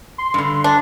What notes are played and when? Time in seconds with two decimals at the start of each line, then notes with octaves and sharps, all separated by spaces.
0.18 C6
0.34 G2 D3
0.64 D4